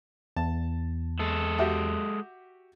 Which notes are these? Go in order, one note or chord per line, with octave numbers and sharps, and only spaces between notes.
E2 A5
G#3 A4
F#4 G4 E5